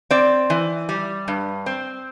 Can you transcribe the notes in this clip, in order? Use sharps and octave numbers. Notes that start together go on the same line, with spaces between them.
C4 D5
E3
G3
G2
C4